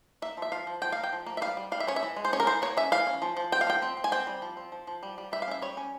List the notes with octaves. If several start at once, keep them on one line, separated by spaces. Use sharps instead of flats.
A#3 E5
F3 E5
F3 F5
F3
F3 G5
A#3 F5
G5
F3
A#3
E5
G3 F5
G3
G3 F5
E5
C#4 C#5
E5
E3
G#3
C5
C#4 C#5
A#4
E3 C5
A#3 C#5
C#4 E5
E3 F5
C#4
F3
F3
C4 G5
F5
F3 G5
C4
C4
G#5
C4 G5
G3
F3
C4
F3
F3
G3
G3
G3 E5
F5
C#4 E5
G3 C#5
C#4